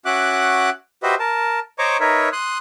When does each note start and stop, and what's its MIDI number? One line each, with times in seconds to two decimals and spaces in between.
0.05 0.70 61
0.05 0.70 66
0.05 0.70 76
0.05 0.70 78
0.05 0.70 86
0.05 0.70 90
1.03 1.15 66
1.03 1.15 67
1.03 1.15 71
1.03 1.15 72
1.03 1.15 75
1.03 1.15 76
1.20 1.59 70
1.20 1.59 81
1.79 1.97 72
1.79 1.97 73
1.79 1.97 75
1.79 1.97 82
1.79 1.97 85
1.79 1.97 86
2.00 2.29 63
2.00 2.29 70
2.00 2.29 71
2.00 2.29 73
2.00 2.29 76
2.33 2.58 84
2.33 2.58 87
2.33 2.58 90